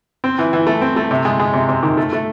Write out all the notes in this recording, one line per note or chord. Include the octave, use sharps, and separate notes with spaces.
C4
E3
E3
A3
C4
A3
C3
G#3
G#3
C3
C3
D#3
A3
A3